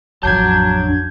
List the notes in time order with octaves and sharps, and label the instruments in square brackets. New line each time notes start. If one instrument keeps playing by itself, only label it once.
[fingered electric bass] A1 F2 F3 [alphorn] F#3 [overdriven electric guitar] D4 A5 [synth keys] G6 G#6